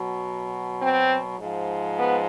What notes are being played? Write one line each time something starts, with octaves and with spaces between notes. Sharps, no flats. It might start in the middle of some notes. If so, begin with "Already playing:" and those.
Already playing: B2 F#3
C4
G#2 F3
B3